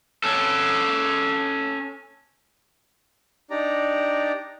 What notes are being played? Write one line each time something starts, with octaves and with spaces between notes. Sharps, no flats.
C#4 A4
D4 D#4 G4 D5 A#5